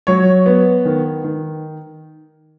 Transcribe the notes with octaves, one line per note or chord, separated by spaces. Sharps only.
F#3 C#5
B3
D#3
D#3